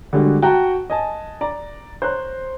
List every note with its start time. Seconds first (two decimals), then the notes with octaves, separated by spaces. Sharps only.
0.13 D3 G3 G#3 D4 F#4
0.42 F#4 F#5 G5 A5 A#5
0.90 D#5 G#5 A5
1.41 D5 A#5
2.02 C5 C#5 A#5 F#6